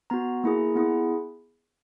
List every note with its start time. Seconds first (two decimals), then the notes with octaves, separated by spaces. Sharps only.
0.10 B3 F#4 A#5
0.44 A#3 E4 G#4
0.75 B3 E4 G#4